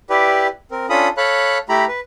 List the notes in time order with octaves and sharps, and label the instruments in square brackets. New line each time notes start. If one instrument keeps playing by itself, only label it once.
[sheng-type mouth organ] E4 G4 B4 D5
C4 A#4
C#4 D4 F4 A4 B5 D#6
A4 C#5 F5 B5 F#6
A3 E4 G4 A#5 B5
B4